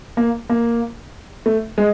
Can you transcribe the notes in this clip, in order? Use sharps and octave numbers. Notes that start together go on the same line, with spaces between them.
A#3
A#3
A3
G#3